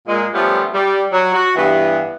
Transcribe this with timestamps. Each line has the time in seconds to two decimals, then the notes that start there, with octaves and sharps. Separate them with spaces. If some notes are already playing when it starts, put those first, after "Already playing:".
0.08 A#2 G#3
0.34 F3 G3 A3 B3 C#4 F4
0.74 G3
1.12 F#3
1.33 F#4
1.56 G2 E3 B3